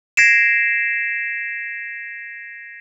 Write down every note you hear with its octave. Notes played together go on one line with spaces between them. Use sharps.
G#6 A#6 C7 D7 E7